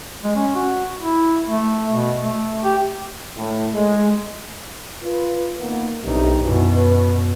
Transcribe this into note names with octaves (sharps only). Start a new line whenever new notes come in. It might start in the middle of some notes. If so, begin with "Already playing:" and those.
G#3
C#4
F#4
E4
A3
B2
A3
G4
A2
G#3
F4 B4
D#3 A#3 B3
B1 G2 C3 D#4
F#2 B2 D#3 E3 F#3
B4